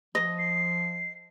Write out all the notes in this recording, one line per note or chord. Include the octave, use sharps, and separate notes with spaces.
F3 D#5
C7